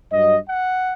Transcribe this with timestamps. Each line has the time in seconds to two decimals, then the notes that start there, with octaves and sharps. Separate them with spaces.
0.11 G2 F#3 D#5
0.48 F#5